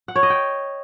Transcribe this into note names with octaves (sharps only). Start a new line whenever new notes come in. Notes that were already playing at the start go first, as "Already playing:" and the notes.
F#5
C#5
D#5
G5